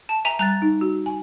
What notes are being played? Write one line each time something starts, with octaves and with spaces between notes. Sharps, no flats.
A5
E5 G#5 A#5
G3 A#5 F#6 A6
D#4
F#4
G#5